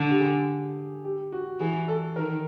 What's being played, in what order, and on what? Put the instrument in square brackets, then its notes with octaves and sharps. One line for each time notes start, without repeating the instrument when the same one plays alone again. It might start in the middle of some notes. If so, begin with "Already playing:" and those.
Already playing: [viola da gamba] D3 [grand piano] A4
[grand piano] G4
G#4
G4
F#4
[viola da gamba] E3 [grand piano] G#4
[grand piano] A4
[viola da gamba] D#3 [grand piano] A#4